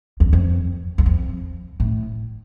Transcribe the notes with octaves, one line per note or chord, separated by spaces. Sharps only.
E2
F2
E2
F2
A2